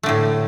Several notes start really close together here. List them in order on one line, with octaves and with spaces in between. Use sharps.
A3 D3 A2